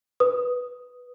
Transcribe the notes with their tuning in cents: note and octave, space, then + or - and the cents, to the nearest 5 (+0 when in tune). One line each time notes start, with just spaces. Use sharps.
B4 +0 D#6 +0